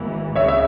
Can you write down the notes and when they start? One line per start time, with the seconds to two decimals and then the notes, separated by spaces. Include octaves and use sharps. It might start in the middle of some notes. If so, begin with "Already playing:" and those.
Already playing: G#1 G#2 E3 A#3
0.35 C#2 C#3 C#5 E5
0.48 E5